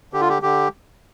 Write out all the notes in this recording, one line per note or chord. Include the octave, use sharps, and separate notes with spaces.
D3 G4
F4
G4
D3 G4